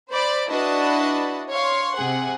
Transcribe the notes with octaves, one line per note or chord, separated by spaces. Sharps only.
C5 D5 B5 A6
D4 E4 F#4 B4 D#5 A5
C#5 F5 C6
C3 G#4 F#5